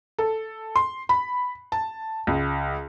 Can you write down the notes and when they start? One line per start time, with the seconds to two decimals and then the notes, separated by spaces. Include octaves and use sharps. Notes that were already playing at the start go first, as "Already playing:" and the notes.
0.19 A4
0.76 C6
1.09 B5
1.72 A5
2.27 C#2